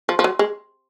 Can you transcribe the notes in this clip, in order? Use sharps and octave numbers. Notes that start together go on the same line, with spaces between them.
F3
F3
F#3
G#3